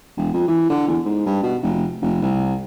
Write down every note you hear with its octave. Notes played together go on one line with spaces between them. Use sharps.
E1
F2
E3
D3
E2
G#2
G2
B2
F1
F1
C2